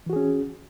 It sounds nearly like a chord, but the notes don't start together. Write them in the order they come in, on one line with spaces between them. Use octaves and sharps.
E3 F#4 G#4 C#4